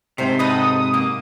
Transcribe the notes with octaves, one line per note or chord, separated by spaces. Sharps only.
G#2 C3 A3 C5
D#4 A4 B4 D#6
A#3